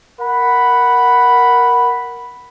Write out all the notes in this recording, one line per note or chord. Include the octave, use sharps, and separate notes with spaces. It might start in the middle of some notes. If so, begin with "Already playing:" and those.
A#4 F#5 B5